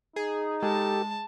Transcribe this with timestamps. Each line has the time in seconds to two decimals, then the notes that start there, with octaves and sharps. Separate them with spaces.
0.16 D#4 G#4
0.63 G#3 G4 A4 A5